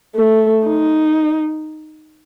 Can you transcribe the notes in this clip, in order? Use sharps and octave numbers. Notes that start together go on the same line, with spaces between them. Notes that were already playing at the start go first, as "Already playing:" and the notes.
A3
D#4